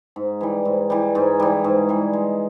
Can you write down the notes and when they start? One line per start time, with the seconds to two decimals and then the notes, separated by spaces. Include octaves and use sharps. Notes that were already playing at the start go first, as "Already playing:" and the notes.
0.16 G#2
0.41 E3 G3
0.65 G#2
0.90 E3 G3
1.15 G#2
1.40 E3 G3
1.64 G#2
1.89 E3 G3
2.13 G#3